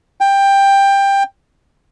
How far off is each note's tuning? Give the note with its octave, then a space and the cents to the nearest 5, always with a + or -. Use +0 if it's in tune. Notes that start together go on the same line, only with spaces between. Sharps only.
G5 +15